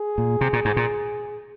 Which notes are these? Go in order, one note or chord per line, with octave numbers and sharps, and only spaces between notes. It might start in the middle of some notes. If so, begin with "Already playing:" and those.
Already playing: G#4
A#2
C3
A#2
G#2
A#2